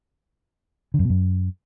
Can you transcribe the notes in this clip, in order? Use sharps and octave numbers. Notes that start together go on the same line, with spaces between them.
D3
F#2
B2
F#2